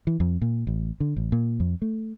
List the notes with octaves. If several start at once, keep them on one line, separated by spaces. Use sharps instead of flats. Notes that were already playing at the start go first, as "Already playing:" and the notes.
E3
F2
A#2
A1
D3
A1
A#2
F2
A3